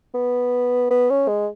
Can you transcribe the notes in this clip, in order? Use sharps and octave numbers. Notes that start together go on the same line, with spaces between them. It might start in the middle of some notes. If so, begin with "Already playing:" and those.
B3
B3
C#4
G#3